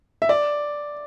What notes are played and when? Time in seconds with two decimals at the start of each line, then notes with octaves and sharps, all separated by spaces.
0.22 E5
0.29 D5